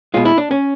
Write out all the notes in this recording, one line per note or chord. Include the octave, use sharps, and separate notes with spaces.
B2 G#3 F4
E4
D4
C#4